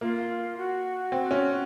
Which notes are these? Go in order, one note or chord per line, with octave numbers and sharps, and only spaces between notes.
A#3 F4
F#4
C4
C#4